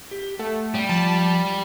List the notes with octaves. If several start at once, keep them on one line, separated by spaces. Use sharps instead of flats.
G4
A3 F#5
G3
F3 A5